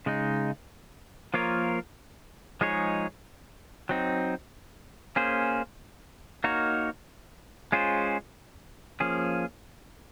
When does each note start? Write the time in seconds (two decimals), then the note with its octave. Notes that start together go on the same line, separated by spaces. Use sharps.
0.06 C#3 G#3 D#4
1.34 F3 A#3 F4 A#4 C#5
2.61 F3 G#3 D#4 G#4 C#5
3.89 F#3 C4 D#4
5.16 A#3 C#4 G#4 C5
6.44 A#3 D#4 F#4 A#4 C#5
7.72 G#3 C#4 F4 G#4 C5
9.00 F3 A#3 C#4 G#4